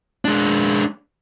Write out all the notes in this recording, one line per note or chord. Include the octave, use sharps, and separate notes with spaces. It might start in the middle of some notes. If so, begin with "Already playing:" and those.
G#3 D4